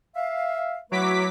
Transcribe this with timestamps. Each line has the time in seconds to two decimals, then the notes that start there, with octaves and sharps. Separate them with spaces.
0.15 E5 F5
0.92 F#3 A3 E4 B4 D6 B6